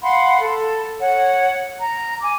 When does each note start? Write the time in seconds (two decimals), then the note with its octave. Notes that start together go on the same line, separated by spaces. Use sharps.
0.03 F5 F#5 B5 C6
0.41 A4
1.00 C#5 F#5
1.79 A#5
2.21 G#5 D6